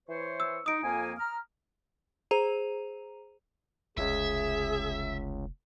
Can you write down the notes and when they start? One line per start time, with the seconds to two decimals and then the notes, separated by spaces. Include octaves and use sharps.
0.08 E3 C5 C#5
0.40 E6
0.66 D#4 D#6 D7
0.83 F2 A#3 G#5
1.19 A#5 F6
2.31 G#4 C5 A#5 D#7 F7
3.98 F1 C#2 G#4 E5